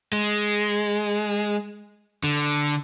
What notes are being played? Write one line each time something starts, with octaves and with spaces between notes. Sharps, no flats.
G#3
D3